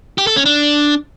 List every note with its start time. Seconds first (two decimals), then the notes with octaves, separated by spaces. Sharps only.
0.18 G4
0.27 A4
0.36 C#4
0.46 D4